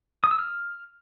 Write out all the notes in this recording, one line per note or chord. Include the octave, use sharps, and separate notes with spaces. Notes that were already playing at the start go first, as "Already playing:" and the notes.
D#6
E6
F6